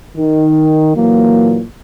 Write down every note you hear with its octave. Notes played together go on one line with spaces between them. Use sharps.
D#3
A#2 E3 F#3 A#3